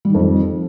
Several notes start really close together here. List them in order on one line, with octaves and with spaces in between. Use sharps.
G3 D#3 F2 F3